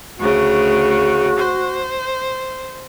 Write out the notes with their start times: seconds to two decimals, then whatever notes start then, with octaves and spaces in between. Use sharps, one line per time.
0.18 D2 C#3 F#4
1.37 C5